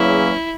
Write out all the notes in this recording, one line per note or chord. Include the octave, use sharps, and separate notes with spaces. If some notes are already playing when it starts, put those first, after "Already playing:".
Already playing: E2 C#3 F#3 A#3 C#4 E4